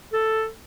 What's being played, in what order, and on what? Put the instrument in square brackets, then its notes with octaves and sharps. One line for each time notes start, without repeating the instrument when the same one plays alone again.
[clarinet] A4